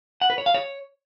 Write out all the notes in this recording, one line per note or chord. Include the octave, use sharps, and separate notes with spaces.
F#5
B4
C#5
F5
C#5